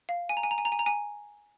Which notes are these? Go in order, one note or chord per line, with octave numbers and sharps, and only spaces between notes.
F5
G#5
A#5
G#5
A#5
G#5
A#5
G#5
A#5
G#5